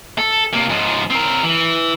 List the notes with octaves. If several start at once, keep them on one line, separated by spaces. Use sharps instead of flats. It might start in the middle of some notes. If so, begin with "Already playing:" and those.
A4
C3 A#3
G#2 F3
C4 A#4
E3